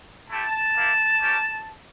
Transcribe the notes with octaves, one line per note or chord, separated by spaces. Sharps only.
A3 E4 G4 A5
A#3 E4 G4
A#3 C#4 G4